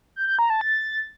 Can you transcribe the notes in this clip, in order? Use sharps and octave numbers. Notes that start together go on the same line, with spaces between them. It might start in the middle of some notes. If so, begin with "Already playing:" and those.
G6
G6
A#5
A5
A6